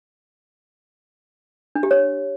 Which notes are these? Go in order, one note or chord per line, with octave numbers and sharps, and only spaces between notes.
D4
G4
C#5